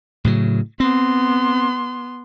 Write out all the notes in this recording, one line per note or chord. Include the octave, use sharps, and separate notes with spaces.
A2 C#3 F#3
B3 C4 C6